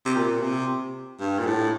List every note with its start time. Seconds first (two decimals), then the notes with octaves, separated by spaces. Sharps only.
0.05 C3
0.16 A#2
0.42 C3
1.20 G2
1.39 A#2
1.46 A2